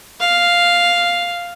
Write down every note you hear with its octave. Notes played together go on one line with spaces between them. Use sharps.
F5